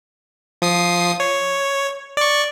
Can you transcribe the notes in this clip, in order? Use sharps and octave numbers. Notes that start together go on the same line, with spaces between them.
F3 D#6 C7
C#5
D5 C#6